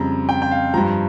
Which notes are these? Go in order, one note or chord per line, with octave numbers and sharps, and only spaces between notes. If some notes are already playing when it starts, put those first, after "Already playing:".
Already playing: F2 C#3 G3 A#5
G5
G5
F5
G2 F3 A#5